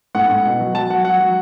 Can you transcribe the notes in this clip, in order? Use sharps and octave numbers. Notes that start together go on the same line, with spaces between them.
A2 F#5
A2
B2
F#3
F#3 A5
F#3 F#5
F#3 F#5
F#3